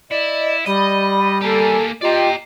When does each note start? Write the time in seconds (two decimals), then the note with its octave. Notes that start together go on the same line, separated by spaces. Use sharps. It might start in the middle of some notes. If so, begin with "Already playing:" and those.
0.11 E4 D5 D#5
0.66 G3 D5 D#5 B5
1.41 A#3 G4 A4 G#5 A#5
2.02 F4 G4 D5 D#5 A#5